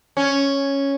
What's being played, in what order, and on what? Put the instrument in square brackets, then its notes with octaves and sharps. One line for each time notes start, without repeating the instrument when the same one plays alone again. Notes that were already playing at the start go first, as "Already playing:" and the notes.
[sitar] C#4